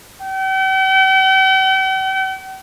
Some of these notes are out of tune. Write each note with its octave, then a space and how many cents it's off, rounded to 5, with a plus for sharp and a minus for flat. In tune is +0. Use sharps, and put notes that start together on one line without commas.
G5 -45